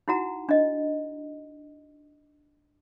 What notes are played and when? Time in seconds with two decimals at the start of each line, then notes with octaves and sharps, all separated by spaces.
0.08 D#4 E4 F#4 F#5 A#5
0.49 D4 D#5